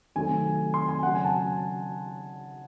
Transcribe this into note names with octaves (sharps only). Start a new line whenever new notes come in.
C3 D#3 F#3 A3 C4 G#5
C6
G#5
C#3 F#3 C#4 F#5
G#5
A5